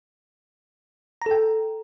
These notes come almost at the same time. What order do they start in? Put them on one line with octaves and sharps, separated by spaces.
A#5 A4 G5